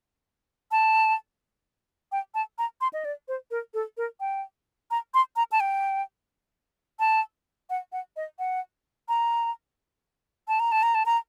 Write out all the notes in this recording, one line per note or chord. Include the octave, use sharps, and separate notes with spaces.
A5
G5
A5
A#5
C6
D#5
D5
C5
A#4
A4
A#4
G5
A#5
C6
A#5
A5
G5
A5
F#5
F#5
D#5
F#5
A#5
A5
A#5
A5
A#5
A5
A#5